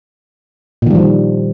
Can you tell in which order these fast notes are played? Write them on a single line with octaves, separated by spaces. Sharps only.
A#2 D#3 G3 F3